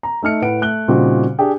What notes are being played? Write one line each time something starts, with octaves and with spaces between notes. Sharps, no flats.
A#5
A3 D#4 F6 C#7
A2 B4 F#5 D7
A3 F#6 G7
A#2 C#3 G3 C4 D#4 F#4
D4 G4 G#4